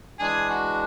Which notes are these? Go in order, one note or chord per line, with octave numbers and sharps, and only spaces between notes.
E3 G#3 D4 G#4
F#4